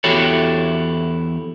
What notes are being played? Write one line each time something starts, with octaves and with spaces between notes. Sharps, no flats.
E2 E4 F#4 G4 A4 C#5